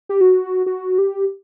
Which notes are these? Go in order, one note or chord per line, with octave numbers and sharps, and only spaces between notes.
G4
F#4
F#4
G4